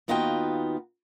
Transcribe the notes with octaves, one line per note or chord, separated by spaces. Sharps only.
D#2 B3 D#4 F4 F#4 G5